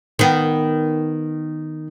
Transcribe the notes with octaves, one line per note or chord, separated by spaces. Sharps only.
D#3 B3